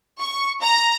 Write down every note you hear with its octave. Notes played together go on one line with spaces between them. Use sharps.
C#6
A#5